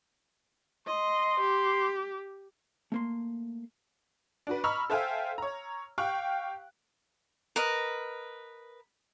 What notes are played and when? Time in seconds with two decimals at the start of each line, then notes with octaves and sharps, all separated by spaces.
0.87 D#5 C6
1.41 G4
2.92 A3 A#3 C6
4.47 D4 F#4 B4
4.64 D#5 A#5 B5 C#6 E6 F6
4.90 A4 C5 E5 F5 G5 G#5
5.38 C#5 A#5
5.98 G4 F5 G5 C#6 F#6
7.56 A#4 B4 D#5